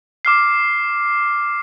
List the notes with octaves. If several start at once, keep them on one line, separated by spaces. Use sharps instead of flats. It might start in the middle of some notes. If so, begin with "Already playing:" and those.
D6 F6 C7